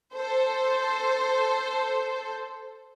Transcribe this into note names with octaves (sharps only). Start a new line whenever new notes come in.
A4 C5